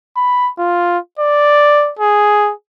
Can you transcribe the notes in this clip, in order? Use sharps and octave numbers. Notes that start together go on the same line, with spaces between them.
B5
F4
D5
G#4